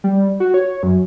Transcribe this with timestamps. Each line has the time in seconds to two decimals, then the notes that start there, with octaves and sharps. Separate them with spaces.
0.04 G3
0.40 F#4
0.54 C#5
0.83 F#2